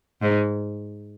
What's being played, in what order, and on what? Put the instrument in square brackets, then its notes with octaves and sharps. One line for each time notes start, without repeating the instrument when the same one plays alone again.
[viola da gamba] G#2